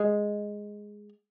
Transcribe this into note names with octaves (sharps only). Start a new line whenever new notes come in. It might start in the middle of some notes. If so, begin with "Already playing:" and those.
Already playing: G#3